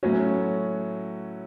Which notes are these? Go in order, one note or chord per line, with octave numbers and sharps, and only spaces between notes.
A2 F#3 C#4 F#4